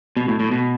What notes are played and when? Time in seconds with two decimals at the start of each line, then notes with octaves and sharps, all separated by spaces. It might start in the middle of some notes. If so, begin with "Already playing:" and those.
0.17 B2
0.28 A2
0.40 A2
0.51 B2